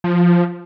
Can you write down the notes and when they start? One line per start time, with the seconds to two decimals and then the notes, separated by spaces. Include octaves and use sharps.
0.04 F3